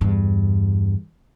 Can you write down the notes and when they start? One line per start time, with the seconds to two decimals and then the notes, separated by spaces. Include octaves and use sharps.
0.01 E2 G2